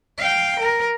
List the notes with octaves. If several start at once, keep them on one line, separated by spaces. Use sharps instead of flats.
F5 G5
A#4